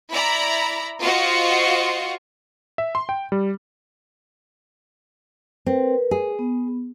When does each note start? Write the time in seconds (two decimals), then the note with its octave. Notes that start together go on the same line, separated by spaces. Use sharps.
0.12 E4 D5 A#5 B5
1.02 F4 F#4 C5 D#5 F5 C#6
2.78 E5
2.95 C6
3.09 G5
3.32 G3
5.66 C4 A#4 B4
6.11 G#4
6.39 B3